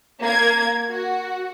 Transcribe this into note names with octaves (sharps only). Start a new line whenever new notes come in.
A#3 G#6
F#4